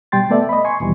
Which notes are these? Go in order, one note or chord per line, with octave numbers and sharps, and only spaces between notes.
B2 G3 G5 C6 A6
A3 B3 A4 D5 E5
D#5 B5
G#5 C6 C#6
D#2 B2 E3 G3